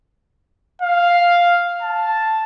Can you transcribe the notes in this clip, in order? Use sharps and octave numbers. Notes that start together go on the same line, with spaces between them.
F5
A5